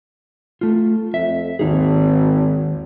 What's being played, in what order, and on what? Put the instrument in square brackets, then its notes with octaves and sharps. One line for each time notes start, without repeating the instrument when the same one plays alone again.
[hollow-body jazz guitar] A3 F4
[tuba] F2 [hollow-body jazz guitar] E5
[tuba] G#1 [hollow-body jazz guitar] D#2 D#4 G#4